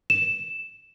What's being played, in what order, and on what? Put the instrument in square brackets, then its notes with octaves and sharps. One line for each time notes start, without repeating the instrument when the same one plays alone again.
[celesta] E7